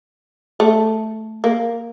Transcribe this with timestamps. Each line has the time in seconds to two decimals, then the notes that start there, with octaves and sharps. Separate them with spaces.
0.60 A3
1.44 A#3